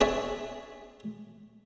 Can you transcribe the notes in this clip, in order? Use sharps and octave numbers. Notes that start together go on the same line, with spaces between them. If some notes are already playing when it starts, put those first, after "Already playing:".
D4 G#4 C#5 E5 A5